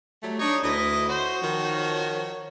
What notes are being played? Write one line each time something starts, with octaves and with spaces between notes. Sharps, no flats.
F#3 G3 A3
D4 D#4 C#5
D2 E4 B4 D#5
F#4 C5 C#5
D#3 F3